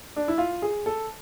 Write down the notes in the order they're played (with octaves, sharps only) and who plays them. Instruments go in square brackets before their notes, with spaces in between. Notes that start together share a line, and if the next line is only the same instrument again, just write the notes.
[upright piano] D4
E4
F4
G#4
A4